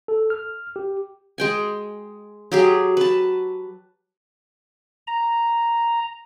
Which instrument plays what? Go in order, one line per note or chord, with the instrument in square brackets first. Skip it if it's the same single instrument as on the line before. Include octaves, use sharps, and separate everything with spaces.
[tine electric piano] A4
F6
G4
[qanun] G#3 G5 G#5
F#3 G4 G#4
B4 A5
[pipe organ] A#5